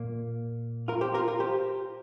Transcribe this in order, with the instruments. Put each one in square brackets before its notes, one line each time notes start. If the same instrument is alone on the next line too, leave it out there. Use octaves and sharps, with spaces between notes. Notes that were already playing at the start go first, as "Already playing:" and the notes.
Already playing: [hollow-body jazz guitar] A#2 A#3
F4 A#4
G4 C5
F4 A#4
F4 A#4
G4 C5